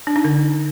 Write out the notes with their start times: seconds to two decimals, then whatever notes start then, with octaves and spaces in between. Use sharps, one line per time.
0.07 D4
0.16 D#4
0.24 D3